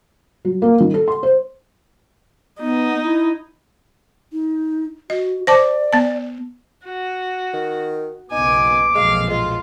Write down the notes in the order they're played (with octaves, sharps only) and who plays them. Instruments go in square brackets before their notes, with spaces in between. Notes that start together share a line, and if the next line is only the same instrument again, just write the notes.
[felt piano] F#3
A#3
D#3
A4
C6
C5
[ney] B3 [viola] D#4
[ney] E4
[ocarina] D#4
[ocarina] F#4 [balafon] D#5
[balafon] C5 A5 D6 [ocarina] D5
[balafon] B3 A5
[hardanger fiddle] F#4
[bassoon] D#3
[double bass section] F#1 B1 B3 [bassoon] D#4 [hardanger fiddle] G#5 [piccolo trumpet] D6
[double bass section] B1 F2 A#2 [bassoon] G#3 [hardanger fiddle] F5
[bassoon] G#3 [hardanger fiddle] F4